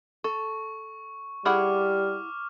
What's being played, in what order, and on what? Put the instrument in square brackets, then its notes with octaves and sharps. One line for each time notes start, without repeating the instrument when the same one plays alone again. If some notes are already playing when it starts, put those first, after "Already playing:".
[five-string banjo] A4 [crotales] C#6
[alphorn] G3 [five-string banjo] E4 G#4 F#5 [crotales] C#6 D6 F6